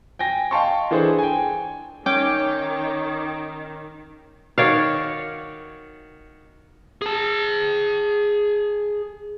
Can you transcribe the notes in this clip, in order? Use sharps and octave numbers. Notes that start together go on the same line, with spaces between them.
G5 G#5 A#6
D#5 F5 G5 A5 C6 C#6
E3 D4 G#4 A4 C5
G5 G#5
D#3 C#4 C#5 G5 D6
D#3 F#4 C#5 D5 F5
G#4 A5